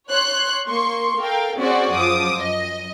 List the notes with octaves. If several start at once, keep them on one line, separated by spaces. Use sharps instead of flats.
C#5 C6 F#6
A#3 C6 C#6
A4 A#4 F5 G5
C4 C#4 F#4 G#4 C5 D5
F#2 F3 D6 D#6
F#2 D#5